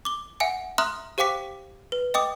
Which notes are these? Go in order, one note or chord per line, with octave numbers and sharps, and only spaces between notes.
D6 G7
E5 F#5 G#5 C#7
E5 A#5 C6 D#6 F6 F#6
G4 C5 F5 G5 D6 B6
B4
D#5 G5 D6 D#6